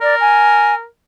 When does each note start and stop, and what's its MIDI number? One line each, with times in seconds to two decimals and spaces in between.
0.01 0.85 70
0.01 0.15 74
0.20 0.74 80